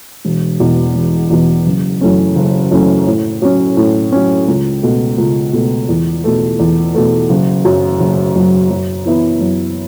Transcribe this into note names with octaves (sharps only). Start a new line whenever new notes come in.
E1
E2 B2
E1
E2 B2
F#1
F#2 E3 A3 C#4
F#1
F#2 E3 A3 C#4
A2
F#3 C#4
A2
F#3 C#4
C#2
B2 A3
C#2
B2 A3
E2
B2 A3
E2
B2 A3
F#1
F#2 F#3
F#1
F#2 F#3
F#2
E3 B3 E4
F#2